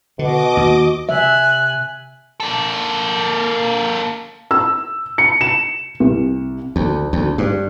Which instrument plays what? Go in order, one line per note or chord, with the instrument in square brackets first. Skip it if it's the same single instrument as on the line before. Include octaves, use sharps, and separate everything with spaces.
[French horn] B2 [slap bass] D3 [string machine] D#5 D6
[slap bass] D#2 [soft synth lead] F#4
[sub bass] C3 [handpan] E5 [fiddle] G#5 F#6
[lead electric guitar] A#3 A4
[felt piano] E6
C#7
E7
C2
[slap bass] D2
D2
G2